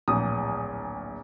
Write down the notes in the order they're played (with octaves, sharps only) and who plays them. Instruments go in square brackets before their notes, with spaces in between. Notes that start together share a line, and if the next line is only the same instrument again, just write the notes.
[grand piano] D1 A#1 D#6